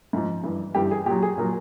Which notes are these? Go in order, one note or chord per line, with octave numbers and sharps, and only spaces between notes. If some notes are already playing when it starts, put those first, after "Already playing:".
G#2 F3
G2 E3
G2 E3 G4
G#4
A#2 F#3 G4
G#4
A#2 F#3 A#4